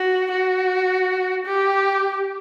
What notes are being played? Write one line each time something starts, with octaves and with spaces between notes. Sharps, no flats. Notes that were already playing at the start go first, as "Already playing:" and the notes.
Already playing: F#4
F#4
G4